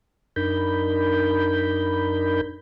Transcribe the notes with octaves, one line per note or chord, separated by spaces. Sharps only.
F#2 D4 D#4 A#4 B5 G6